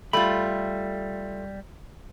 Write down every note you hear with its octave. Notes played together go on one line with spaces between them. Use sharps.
G3 A3 F4 B5